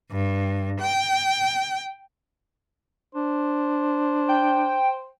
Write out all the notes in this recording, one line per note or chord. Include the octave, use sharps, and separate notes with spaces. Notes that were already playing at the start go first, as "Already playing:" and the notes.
G2
G5
D4 C5
G5